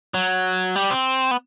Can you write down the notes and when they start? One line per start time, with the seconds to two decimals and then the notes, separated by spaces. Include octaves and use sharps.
0.14 F#3
0.76 G3
0.90 C4
1.31 B3